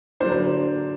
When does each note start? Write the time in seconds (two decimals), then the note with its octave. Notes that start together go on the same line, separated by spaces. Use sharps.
0.20 D3 F#3 A#3 D4 C5
0.32 C5